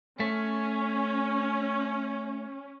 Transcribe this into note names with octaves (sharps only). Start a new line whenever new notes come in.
A3 C#4